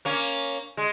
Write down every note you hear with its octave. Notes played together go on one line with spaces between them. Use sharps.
A#3 C#4
G#3